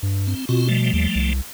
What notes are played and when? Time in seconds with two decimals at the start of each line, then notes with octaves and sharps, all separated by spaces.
0.03 G2
0.27 C4
0.49 B2 C4 F4 F#4
0.69 F3 G3 A3
0.93 D#2
1.15 C2